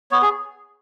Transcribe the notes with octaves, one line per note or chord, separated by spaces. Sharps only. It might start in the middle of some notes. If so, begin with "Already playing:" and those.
B3 C#5
G#4